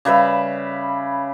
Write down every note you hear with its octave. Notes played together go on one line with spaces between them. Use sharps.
C#3 G3 B4 E5